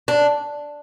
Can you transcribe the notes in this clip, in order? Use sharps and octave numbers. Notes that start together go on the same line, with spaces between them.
D4